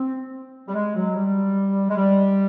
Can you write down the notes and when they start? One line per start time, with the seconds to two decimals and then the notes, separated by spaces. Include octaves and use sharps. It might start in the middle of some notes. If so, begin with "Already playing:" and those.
Already playing: C4
0.68 G3
0.74 G#3
0.96 F#3
1.16 G3
1.90 G#3
1.97 G3